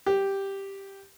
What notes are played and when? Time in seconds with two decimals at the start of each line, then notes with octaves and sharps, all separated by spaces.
0.06 G4